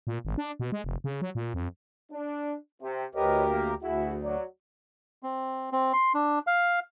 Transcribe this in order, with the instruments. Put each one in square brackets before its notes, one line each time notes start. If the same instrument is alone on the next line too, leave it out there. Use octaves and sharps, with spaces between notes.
[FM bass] A#2
G#1
D4
B2
G#3
F1
C#3
F#3
A#2
F2
[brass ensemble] D4
C3
[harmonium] D2 G4 A#4 [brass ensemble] B4 C#5 D#5
[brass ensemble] A#3
[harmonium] D2 [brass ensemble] E4 F#4 G#4
[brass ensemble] F#3 D5
[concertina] C4
C4
C6
D4
F5